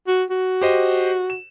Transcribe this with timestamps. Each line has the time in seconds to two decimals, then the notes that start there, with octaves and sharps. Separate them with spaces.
0.08 F#4
0.30 F#4
0.61 G4 C5 D#5
1.30 E7